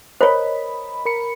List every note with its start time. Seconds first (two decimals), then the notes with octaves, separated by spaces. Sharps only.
0.21 A#4 C5 C#5 D#5 B5
1.05 A#4 B5 C#7